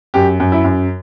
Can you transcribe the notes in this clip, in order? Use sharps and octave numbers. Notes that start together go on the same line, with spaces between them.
F#2 G4
F#2
E4
F#2